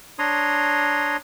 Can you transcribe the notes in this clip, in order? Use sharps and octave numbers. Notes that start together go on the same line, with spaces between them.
D4 C#5 A#5 C6 D#6